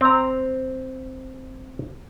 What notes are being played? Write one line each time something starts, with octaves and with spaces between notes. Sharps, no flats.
C4 A#5